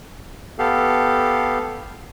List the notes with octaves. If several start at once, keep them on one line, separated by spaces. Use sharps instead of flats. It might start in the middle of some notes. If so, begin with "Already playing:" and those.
B3 G4 A4 F5